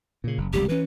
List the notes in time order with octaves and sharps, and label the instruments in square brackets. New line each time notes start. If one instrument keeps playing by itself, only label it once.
[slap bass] A#2 C#3
F#1
[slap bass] F1 C#2 G3 [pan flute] G4
[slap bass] E3 C#4 [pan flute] B4